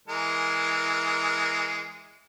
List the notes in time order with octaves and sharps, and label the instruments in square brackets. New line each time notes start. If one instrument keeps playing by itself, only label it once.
[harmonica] E3 G#3 A#4